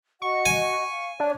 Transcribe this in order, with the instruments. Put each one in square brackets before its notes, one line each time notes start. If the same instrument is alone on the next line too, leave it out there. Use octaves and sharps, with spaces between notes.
[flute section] F#4 D#5 F#5 [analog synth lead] C#6
[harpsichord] G#5
[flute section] F5
[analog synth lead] D4 [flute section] C#5